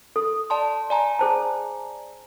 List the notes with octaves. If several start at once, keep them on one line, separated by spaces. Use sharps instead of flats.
A4
D5 A5 C6
D5 G#5 A#5
G#4 C5 A5